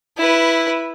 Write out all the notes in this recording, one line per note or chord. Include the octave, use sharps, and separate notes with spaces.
E4 B4